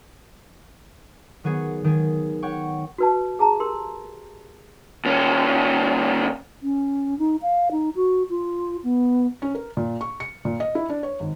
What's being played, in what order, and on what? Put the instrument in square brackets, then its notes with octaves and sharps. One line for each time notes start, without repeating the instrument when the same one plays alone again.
[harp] D#3 F#3 B3 G#4 C#5
D#3 G#3 G#4
C#5 F#5 G5 C#6
[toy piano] F#4 B4 A5
G#4 A5 A#5
G4 A#4 C6
[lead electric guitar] D#2 C#4
[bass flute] C#4
D#4
F5
D#4
F#4
F4
B3
[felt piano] C#4
A#4
A#2
C#6
C#7
A#2
D#5
E4
D4
C#5
G#1